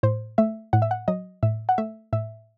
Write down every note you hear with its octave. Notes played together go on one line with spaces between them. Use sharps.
A2 C5
A3 E5
A2 F#5
E5
F#5
F#3 D#5
A2 E5
F#5
A3 E5
A2 E5